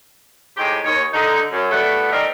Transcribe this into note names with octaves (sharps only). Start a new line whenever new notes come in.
A2 C3 G#3 D#4 G4
D#2 D#4 C#5
D3 D#4
F#2
G3 A3 B3 E4 F#4 A4
G3 A3 C4 D#4 A#4